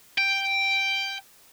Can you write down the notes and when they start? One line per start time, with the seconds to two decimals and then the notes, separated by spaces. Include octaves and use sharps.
0.18 G5